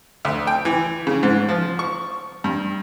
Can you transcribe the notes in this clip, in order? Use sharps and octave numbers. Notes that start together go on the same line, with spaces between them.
D2
G5
E3
C#3
G#2
F3
C#6
G2